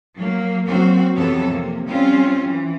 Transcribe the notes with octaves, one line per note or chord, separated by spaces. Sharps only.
F#3 A#3
F#3 A#3 C4 F#4
F2 C3 E3 B3 A4 C#5
C3 A#3
G3 C4 C#4 F4
E3